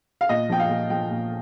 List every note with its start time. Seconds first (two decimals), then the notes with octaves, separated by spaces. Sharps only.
0.21 F5
0.29 A#2 D#5
0.49 F3 G5
0.60 F5
0.69 A#2
0.90 F3 G5
1.11 A#2